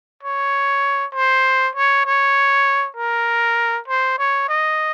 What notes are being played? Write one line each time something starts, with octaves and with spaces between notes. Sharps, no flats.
C#5
C5
C#5
C#5
A#4
C5
C#5
D#5